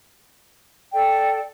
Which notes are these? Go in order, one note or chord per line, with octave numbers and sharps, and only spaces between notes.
A4 D5 G5